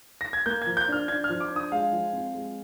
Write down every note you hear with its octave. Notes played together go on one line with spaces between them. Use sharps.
A#6
G#6
A#3 G6
G#6
F3
G6
D4 F6
D4 G#6
F6
F3
D6
D4
D#6
G#3 F5
F3
C4
G#3